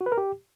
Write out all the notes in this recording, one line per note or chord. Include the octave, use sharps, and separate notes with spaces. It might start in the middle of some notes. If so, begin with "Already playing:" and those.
F#4
B4
A#4
G4